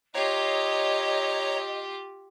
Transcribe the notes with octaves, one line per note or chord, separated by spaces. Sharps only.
F4 G4 C#5 D#5 A#5